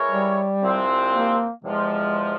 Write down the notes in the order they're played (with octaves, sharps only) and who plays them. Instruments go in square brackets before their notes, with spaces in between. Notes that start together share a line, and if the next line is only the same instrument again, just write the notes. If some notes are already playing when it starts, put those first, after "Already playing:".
Already playing: [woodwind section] E3 G#3 E4 A#4 C#5
[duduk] G3
[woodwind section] C2 C3 F3 G#3 C4
[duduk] A#3
[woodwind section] E2 C3 F3 [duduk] G#3